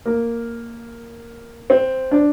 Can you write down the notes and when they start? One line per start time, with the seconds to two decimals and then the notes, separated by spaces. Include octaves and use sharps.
0.06 A#3
1.70 C4
2.11 D4